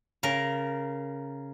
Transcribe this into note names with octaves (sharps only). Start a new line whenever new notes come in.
C#3 A#4